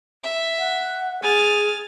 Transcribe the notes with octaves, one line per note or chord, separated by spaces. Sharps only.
E5
F#5
G#4 G#5 F6 A6